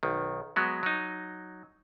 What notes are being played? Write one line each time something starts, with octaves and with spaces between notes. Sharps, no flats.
B1 D#3
F#3 G#3 B3
F#3 D#4